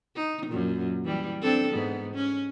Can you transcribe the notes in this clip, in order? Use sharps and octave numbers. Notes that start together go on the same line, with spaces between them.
D#4
F#2 A#2
E3 G3
C4 D4 A4
G#2 B3
C#4